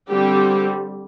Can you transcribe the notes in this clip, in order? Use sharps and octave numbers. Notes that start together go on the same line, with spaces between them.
D3 G3 C4 G4